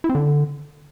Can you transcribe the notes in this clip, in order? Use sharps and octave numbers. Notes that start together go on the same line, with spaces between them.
E4
C4
D3